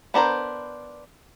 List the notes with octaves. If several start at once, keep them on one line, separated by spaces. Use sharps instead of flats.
B3 D4 A#4 C5